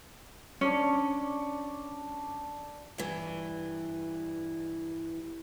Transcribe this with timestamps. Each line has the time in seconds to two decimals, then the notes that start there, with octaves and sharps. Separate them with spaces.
0.61 C#4 D4 D5 C#6
2.98 G2 E3